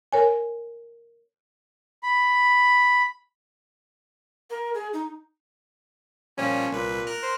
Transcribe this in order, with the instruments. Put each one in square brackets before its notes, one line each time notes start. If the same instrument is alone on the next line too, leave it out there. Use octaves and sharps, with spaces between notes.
[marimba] A#4 C#5 G#5
[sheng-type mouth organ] B5
[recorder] A#4
G#4
D#4
[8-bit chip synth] A#2 F3 G3 [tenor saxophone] C#4
[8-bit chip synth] C2 B4 [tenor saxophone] A#2
[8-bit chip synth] A#4 F6 F#6
[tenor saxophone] C5